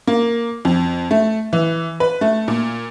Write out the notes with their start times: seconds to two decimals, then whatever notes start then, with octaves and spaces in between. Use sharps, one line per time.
0.07 A#3
0.65 F2
1.11 A3
1.53 E3
2.00 B4
2.21 A3
2.48 A#2